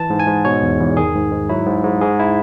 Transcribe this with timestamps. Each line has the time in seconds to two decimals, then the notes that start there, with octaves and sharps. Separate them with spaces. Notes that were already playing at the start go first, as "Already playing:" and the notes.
Already playing: E3 A5
0.10 G#2
0.20 G#5
0.27 G#2
0.45 B2 C#5
0.63 E2
0.80 E2
0.97 D#3 G#4
1.15 G#2
1.31 G#2
1.49 F#3 E4
1.66 G#2
1.84 G#2
2.01 G#2 G#4
2.19 E4